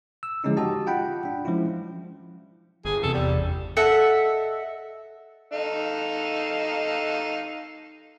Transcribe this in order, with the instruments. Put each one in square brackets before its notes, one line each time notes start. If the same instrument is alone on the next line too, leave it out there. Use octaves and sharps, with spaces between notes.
[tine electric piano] E6
D3 F3 G#3 C#4 D#4 E4
F#4 G4 D#5 A5
F4 F#5 G5 B5
D4
F3 G#3 C#4 E4 F4
[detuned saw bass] G1 [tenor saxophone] G#4
[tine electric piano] E2 C3 [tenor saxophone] A4
[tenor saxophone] G3
[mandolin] A4 D#5 E5 F#5
[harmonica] D#4 A4 F5